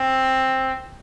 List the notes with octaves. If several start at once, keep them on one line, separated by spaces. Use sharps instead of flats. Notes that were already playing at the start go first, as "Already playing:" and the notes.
Already playing: C4